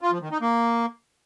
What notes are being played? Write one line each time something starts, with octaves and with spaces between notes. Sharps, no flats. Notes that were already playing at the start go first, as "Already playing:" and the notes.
F4
F3
D#3
D#4
A#3